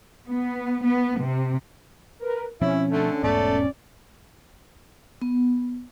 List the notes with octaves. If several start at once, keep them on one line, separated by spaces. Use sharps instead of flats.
B3
B3
C3
A#4 B4
B2 F3 C4 C#4 E4
D3 A3
E1 G#2 A3 B3 D5
B3